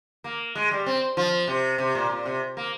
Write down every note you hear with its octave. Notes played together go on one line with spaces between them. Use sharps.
A#3
G#3
G3
C4
F3
C3
C3
A#2
A#2
C3
A#3